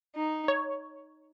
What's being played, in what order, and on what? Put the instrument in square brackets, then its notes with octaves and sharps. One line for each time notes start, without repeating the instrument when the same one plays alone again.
[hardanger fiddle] D#4
[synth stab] C#5